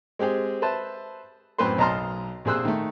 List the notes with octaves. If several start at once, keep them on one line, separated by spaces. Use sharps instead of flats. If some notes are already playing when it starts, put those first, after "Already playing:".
G#3 C4 G4 G#4
B4 C5 E5 A5
F#2 A2 C4 B4 C5 C6
B1 D#5 A5 A#5 C6 F6
A#1 C3 G#4 C5 E6 F#6
D#3 A3